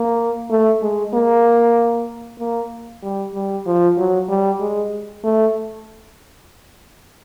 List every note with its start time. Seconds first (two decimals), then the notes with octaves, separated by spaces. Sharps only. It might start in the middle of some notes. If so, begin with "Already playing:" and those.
Already playing: A#3
0.50 A3
0.82 G#3
1.14 A#3
2.39 A#3
3.02 G3
3.34 G3
3.66 F3
3.97 F#3
4.29 G3
4.60 G#3
5.24 A3